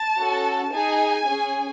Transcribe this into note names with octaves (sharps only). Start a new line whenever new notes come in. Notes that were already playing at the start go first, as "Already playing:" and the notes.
Already playing: A5
C#4 F#4 A4
D#4 G#4 G#5
C#4 G#4